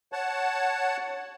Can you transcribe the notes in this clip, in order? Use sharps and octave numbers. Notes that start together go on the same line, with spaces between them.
C#5 F#5 A5